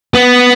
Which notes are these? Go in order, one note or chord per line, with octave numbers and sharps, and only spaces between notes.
B3